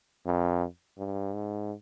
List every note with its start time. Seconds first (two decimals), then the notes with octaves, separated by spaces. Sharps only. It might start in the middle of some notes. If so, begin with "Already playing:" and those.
0.26 F2
0.98 G2
1.35 G#2